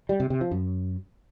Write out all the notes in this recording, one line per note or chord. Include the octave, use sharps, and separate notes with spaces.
G3
C3
C3
F3
F#2